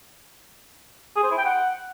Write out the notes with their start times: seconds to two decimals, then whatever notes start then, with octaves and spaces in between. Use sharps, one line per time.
1.16 G#4
1.23 C5
1.31 E4
1.38 G5
1.45 F#5